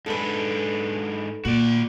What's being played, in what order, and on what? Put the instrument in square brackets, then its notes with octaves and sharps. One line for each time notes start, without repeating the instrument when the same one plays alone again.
[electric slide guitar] G#2 D4 [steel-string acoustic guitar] A4 B4
[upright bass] A#2 [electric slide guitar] F#4 D5